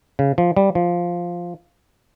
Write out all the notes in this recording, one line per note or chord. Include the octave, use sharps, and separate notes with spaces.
C#3
F3
G3
F3